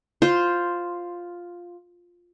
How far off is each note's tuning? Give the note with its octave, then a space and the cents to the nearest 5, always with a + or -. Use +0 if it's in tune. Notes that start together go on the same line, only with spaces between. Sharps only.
F4 +5 C5 +0